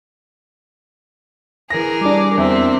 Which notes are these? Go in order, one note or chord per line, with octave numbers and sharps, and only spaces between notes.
E3 G#4 A#4 A#6
G3 D4 D6
E2 C4 E5